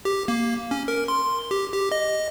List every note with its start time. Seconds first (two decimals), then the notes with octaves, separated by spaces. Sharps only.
0.05 G4
0.28 A#3
0.71 C#4
0.88 A#4
1.08 C6
1.51 G4
1.72 G4
1.92 D#5